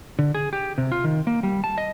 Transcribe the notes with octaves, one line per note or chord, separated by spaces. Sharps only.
D3
G#4
G4
C3
F4
D#3
A#3
G3
A5
D#5